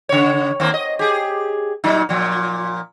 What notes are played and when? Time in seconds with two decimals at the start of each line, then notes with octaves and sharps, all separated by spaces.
0.09 C#3 C#5
0.60 D#2 A#3 C4
0.74 D#5
0.99 G4 G#4
1.84 A#2 F#3 D#4
2.09 A#2 F3